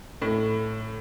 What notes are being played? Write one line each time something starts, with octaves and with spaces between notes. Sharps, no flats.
A2